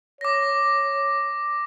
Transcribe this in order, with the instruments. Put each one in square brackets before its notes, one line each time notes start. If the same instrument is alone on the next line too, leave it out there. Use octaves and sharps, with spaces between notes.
[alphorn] C#5 [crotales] D6 A#6